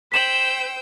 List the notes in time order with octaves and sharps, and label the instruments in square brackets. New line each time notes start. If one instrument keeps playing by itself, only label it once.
[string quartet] C5 G5 E6 [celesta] B6 E7 F#7